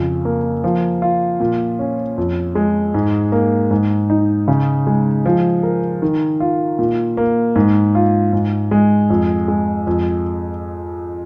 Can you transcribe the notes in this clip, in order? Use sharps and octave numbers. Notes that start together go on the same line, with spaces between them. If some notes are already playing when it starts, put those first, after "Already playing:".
Already playing: F2 C#3 F4
A#3
F3
F4
A#2
C#4
F2
G#3
G#2
A#3
G#2
D#4
C#3
G#3
F3
A#4
D#3
F4
A#2
A#3
G#2
F4
G#2
G#3
F2
G#3
F2